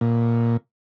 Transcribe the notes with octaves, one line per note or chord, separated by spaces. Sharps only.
A#2